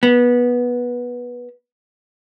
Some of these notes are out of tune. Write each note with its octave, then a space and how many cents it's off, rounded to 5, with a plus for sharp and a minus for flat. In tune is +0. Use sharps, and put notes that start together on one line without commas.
B3 -15